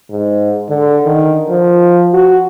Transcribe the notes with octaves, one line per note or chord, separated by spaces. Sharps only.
G#2
D3
D#3
F3
F#4